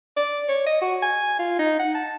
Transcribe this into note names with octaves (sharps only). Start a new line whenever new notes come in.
D5
C#5
D#5
F#4
G#5
F4
D#4
F#5
A5